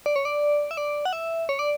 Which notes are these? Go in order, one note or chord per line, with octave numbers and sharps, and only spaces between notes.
D5
C#5
D5
E5
D5
F#5
E5
C#5
D5